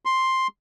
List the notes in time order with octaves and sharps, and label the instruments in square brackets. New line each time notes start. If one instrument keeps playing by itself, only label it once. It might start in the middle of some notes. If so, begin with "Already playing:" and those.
[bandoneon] C6